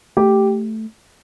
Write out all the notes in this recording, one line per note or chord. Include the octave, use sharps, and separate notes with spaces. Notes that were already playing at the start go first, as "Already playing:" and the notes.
A3 G4